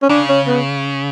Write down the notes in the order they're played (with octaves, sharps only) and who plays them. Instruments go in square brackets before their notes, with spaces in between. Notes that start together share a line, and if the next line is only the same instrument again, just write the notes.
[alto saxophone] C#4
[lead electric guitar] C#3 [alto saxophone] D4
[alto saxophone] C#4
B3